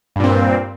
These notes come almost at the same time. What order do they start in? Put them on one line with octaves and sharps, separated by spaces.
G2 A#2 C4